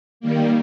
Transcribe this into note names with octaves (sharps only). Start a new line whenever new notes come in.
D#3 G3 A#3